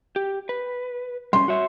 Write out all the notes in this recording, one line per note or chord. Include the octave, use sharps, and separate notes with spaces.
G4
B4
G3 C#4 C6
F#4 C#5 E5